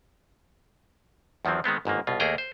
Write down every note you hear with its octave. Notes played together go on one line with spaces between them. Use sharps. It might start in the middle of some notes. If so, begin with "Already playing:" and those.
E2 D#3 F3 F#3 C4
D#3 G#3 B3 C4
G1 G#2 D#3 A#3
C2 B2 F4
D#2 A3 A#3 G#4 G5 A#5
C5